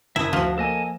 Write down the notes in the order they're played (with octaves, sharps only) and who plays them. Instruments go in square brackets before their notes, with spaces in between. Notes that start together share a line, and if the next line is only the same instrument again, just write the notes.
[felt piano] F#1 [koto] E4 [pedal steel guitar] E5 A5 D#6
[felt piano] D2 F#4 [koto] F3
[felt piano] A#3 [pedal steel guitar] A4 D#5 G#5